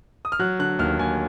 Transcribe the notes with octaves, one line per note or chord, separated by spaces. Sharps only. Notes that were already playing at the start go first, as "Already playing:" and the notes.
D#6
F6
F#3 F#6
D3 F#6
D#2 F6
D#2 G#5